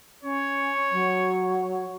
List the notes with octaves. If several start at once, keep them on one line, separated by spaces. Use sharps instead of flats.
C#4 C#5
F#3